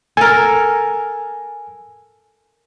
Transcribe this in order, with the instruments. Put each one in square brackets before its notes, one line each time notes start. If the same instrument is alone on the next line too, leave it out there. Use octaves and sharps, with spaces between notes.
[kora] A4 A#4 [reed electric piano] G#5